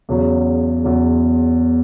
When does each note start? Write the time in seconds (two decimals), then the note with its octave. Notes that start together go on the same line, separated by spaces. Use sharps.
0.09 E2 C#3 F#3
0.84 E2 C#3 F#3